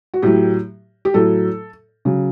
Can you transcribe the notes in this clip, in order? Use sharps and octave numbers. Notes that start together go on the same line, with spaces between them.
F#4
A2 F#3 G4
G4
A2 F#3 A4
C#3 F#3